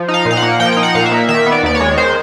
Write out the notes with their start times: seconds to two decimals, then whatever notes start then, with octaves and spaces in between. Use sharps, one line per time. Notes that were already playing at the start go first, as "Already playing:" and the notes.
Already playing: F3
0.08 D#4
0.14 F5
0.25 A#2
0.31 F5
0.37 F#5
0.42 A#3
0.59 F3 G5
0.73 D#4 G5
0.83 F#5
0.95 A#2 F5
1.06 E5
1.12 A#3
1.29 D#3 E5
1.46 B3
1.52 D5
1.63 D#2 D5
1.75 C#5
1.80 G#3
1.97 D#3 C5